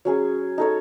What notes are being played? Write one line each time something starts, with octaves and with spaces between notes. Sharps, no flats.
F#3 C#4 G#4
D#4 A4 C#5